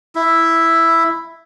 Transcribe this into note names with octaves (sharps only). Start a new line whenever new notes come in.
E4